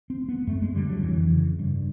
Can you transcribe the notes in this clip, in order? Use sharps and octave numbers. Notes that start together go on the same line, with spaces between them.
C4
B3
F#2 A3
G#3
D3 G3
F#3
F2 E3
C#3
G2